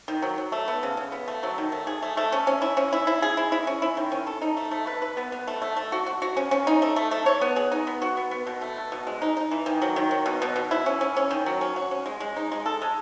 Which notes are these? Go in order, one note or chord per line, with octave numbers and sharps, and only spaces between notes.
D#3
F#3
F#3
A3
B3
C#3
C#3
B3
A3
F#3
D#3
A3
G#4
A3
A3
C#4
C#4
E4
C#4
E4
E4
G#4
E4
E4
C#4
E4
D#3
C#4
A4
D#4
A3
A3
B4
B4
B3
B3
A3
A3
A3
F#4
F#4
F#4
C#4
C#4
D#4
A3
A3
A3
C#5
B3
G#4
D#4
B3
F#4
B3
B3
B2
A3
B2
B2
G#3
D#4
D#4
E3
D#3
F#3
D#3
F#3
B2
B2
B2
E4
C#4
C#4
C#4
D#3
F#3
C#4
F#4
C#4
G#3
G#3
D#4
G#3
A4
G#3